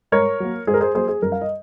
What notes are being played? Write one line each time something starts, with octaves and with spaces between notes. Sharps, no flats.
G#2 A#4 C#5
F#3 A#3
G#2 G#4 C5
A#4
G#4 C5
F#3 A#3 G#4 C5
G#4
F#2 A#4
F5
D#5